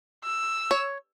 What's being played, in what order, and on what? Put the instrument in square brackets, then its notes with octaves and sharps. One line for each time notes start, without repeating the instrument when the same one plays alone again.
[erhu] E6
[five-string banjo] C#5